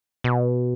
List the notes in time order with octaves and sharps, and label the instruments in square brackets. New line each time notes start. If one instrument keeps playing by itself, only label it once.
[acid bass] B2